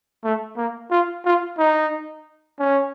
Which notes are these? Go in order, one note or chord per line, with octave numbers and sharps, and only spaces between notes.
A3
A#3
F4
F4
D#4
C#4